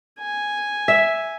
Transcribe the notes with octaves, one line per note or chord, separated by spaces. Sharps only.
G#5
E5